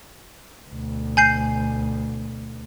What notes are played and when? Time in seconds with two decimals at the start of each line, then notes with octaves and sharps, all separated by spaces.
0.68 D2 B2
1.17 G#5 G6 C7